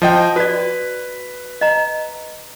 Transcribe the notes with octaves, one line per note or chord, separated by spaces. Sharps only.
F3 D#5 G5
F#4 B4 D5
D#5 A#5